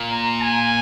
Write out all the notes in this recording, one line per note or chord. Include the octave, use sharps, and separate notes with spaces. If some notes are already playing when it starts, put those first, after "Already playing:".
Already playing: A#2
A#5
G#5